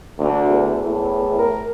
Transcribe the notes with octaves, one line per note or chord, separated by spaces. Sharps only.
D2
E2
A2
A#4